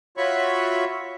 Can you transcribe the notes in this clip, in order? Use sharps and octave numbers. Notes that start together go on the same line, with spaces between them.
F4 F#4 C#5 E5 B5 C#6